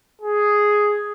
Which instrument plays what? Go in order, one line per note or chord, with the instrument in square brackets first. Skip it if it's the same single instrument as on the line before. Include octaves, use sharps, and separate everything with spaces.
[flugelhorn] G#4